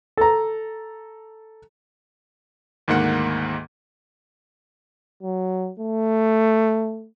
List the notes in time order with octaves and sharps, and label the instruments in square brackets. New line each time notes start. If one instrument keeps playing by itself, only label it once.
[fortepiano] A4 A#5
[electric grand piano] D2 G#2 D#3 A#3 F#5
[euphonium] F#3
A3